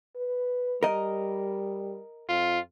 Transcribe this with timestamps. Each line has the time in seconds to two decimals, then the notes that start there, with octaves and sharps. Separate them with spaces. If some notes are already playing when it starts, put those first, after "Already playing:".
0.16 B4
0.83 G3 A#4 D#5
2.29 F2 F4